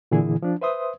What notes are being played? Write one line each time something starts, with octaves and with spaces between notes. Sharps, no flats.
A#2 D3 E3 E4 G#4
F3 D4
B4 C5 E5 C6 D#6